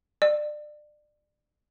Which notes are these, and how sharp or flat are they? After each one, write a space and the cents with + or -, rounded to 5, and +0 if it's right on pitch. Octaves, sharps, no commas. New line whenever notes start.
D5 +25